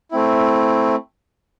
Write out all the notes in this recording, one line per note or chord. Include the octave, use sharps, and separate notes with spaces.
A3 C4 E4